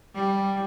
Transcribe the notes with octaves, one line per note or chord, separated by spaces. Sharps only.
G3